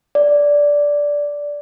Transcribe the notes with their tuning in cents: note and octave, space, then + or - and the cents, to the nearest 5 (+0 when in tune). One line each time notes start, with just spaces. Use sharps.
D5 -10